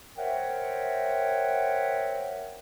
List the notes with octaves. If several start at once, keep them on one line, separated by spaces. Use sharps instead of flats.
A#4 C5 C#5 E5 F#5 G5